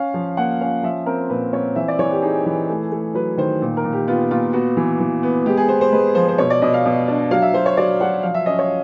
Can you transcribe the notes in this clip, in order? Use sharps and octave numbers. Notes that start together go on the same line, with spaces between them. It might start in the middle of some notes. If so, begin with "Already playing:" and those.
Already playing: C#4 F5
F3
A#3 F#5
C#4 F5
F3 E5
C4 A#4
A#2 B4
C4 C#5
E3 E5
D5
E3 C#5
G4
D#4 G#4
E3
A3
A3
F#3 B4
D#3 C5
A#2
A#4
A#2
G4
B3 F4
A#2 F4
B3 F#4
E3
E3
B3
G#3 G4
G#4
B3 C5
C5
G#3 B4
F3 C5
C5
B2 C#5
D5
B2 D#5
F5
B2
D4
F#3 F5
E5
F#3 C5
C#5
F#3 D5
F#3 F#5
F3 F5
E5
C#4 D#5
C#5